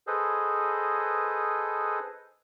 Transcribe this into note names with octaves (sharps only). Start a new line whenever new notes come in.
G#4 A4 B4 C5 D#5